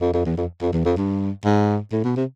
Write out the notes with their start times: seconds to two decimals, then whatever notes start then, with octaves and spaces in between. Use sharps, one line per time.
0.01 F2
0.14 F2
0.26 E2
0.37 F2
0.62 F2
0.73 E2
0.85 F2
0.97 G2
1.45 G#2
1.92 A2
2.04 B2
2.16 C3